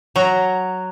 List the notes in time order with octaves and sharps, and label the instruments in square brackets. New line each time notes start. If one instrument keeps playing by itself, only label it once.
[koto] F#3 A#5